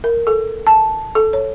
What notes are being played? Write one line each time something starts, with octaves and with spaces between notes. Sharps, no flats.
A#4
A4
A5
A4
C#5